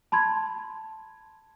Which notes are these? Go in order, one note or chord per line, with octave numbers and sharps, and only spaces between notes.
A5 B5 C6 G#6